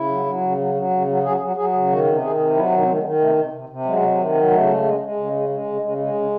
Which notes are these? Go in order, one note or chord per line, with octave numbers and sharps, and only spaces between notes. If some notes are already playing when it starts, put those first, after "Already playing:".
Already playing: C#3 E4
F#3
F#3
C#3
F#3
F#3
C#3
F#3
F#3 G#4
F#3
F#3 G#4
C#3
D#3 F#4
C3
D#3 G#4
C3
F#3 E4
D#3
D#4
C4
D#3 A3
G#3
D#3
C3 A3
C3
C3
C3
F#3 G#3
C3
D#3
F#3
C#3 A3
G#3
G#3
G#3
C#3
G#3
G#3
C#3
C#3 G#3
G#3
C#3